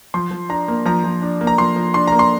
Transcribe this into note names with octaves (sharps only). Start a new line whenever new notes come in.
F3 C6
F3
D4 A#5
A#3
F3 A#5
F3
D4
A#3
A#5
F3 C6
F3
D4 C6
A#3 A#5
C6